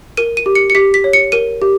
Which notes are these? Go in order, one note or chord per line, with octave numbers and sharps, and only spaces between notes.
A#4 D#7
D#7
G4
C#7
C#7
G4 B6
B6
C#5
C#7
A#4 D#7
G4